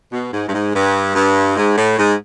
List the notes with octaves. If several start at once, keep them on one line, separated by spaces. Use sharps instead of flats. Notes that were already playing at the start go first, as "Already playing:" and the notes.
B2
G#2
G2
G#2
G2
G2
G#2
A2
G#2